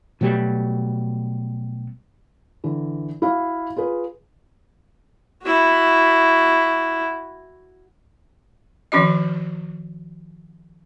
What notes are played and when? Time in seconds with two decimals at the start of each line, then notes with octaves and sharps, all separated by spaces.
0.21 B2 F#3 G3 A3
2.64 D3 E3
3.22 E4 F#4 F5
3.76 F4 G#4 B4
5.43 E4 F#4
8.92 D#3 F3 C#4 F#4 D#5